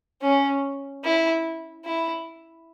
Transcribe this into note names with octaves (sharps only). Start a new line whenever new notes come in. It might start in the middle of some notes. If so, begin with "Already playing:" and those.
C#4
E4
E4